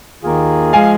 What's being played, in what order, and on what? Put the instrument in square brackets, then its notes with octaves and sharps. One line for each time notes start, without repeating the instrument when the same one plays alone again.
[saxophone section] D#2 D#3 A#3 F4 G#4
[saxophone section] F3 G#3 [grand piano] F5 G#5